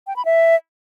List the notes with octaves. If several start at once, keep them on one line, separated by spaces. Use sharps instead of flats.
G5
B5
E5